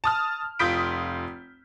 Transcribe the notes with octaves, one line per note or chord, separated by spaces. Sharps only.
A5 D#6 F6
F1 F4 D#6 G6 B6 D7